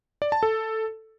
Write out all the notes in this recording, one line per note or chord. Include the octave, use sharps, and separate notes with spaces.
D5
A5
A4